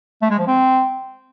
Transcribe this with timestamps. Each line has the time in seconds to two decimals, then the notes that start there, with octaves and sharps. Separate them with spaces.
0.22 A3
0.30 G#3
0.39 F3
0.47 C4